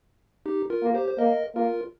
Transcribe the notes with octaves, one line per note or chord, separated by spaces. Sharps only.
D#4 G4
F4 A#4
A#3
G4 C5
C5
A#3 A#4 D#5
A#3 F4 A#4